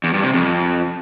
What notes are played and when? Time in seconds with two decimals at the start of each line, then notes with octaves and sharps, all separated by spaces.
0.04 E2
0.14 G2
0.23 C3
0.33 F2